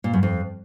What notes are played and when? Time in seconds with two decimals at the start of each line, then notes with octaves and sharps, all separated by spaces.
0.04 A#2
0.13 F#2
0.23 F2